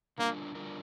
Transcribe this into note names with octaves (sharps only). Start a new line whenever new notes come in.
D3 G3 A#3 D4 F4 A#4
D3 G3 D4 F4 A#4